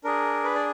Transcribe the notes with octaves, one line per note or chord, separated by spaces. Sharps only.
D4 G#4 A#4
B4
D5